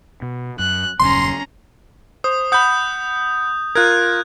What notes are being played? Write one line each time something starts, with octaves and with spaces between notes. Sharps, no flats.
B2
F#2 F#6
D#1 F#2 C#3 C#4 A#5 C6
C5 D#6
F#5 B5 D#6 G6
F4 A#4 F#6 G#6